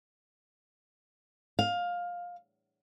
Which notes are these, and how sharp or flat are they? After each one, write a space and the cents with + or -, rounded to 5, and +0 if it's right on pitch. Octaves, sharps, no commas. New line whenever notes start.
F5 +15